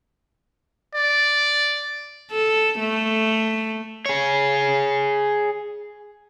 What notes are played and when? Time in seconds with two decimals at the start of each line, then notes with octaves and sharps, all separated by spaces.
0.96 D5
2.31 A4
2.79 A3
4.06 G#4 C#5